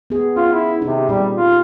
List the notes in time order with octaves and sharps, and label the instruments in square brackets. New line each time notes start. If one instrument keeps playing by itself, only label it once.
[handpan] B3 G#4
[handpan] C#4 [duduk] F4
[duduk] E4
[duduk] C3 [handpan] D#4
[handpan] A#2 C4 G4 [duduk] G3
[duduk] F4